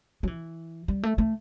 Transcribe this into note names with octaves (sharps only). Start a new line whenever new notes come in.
F#3
E3
G3
A3
A3